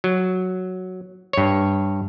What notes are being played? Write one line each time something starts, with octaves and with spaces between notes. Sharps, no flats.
F#3
G2 C#5